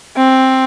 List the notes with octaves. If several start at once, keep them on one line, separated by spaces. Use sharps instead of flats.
C4